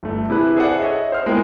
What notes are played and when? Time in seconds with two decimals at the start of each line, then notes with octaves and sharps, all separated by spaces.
0.03 G1 A3
0.29 C3 E4 G#4 B4
0.57 G#4 A4 C5 D5 E5 F#5
0.80 C#5 D#5 E5 F#5
1.12 C5 F6
1.26 G#3 A#3 B3 E4 A#4 G5